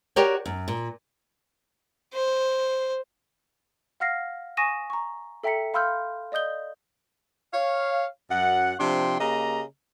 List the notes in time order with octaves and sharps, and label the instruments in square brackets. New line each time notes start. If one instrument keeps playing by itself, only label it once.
[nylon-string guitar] F#4 G4 A#4 C#5 D5 G5
F#2
A#2
[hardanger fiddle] C5
[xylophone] F5 F#5 F6 A#6 C7
G#5 C#6 D#6 A#6 D#7 E7
A#5 C#6
A4 E5 G5 A#5 B6 C#7
F5 B5 C6 E6 F6 G6
D5 D#5 D#6 G6 G7
[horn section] C#5 F5
F#2 F#5
C3 F3 D4 G5 C6
C#3 A#3 G4 D#5 A#5